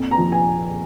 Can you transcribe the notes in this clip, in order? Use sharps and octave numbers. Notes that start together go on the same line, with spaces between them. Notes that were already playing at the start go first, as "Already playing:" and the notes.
Already playing: F2 A#2
A#5
F3
G#5